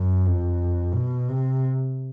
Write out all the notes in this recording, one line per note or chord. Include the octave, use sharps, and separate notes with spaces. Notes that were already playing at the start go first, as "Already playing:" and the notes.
Already playing: F#2
F2
B2
C3